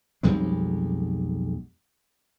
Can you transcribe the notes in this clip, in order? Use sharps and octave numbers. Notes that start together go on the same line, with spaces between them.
B1 F2 G3 G#3